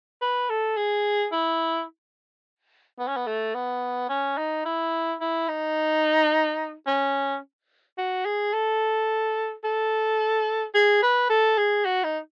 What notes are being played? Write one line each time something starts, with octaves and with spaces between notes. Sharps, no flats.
B4
A4
G#4
E4
B3
C#4
B3
A3
B3
C#4
D#4
E4
E4
D#4
C#4
F#4
G#4
A4
A4
G#4
B4
A4
G#4
F#4
D#4